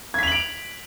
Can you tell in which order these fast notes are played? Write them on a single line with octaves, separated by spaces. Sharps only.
G#6 B6 F7 F#7 D7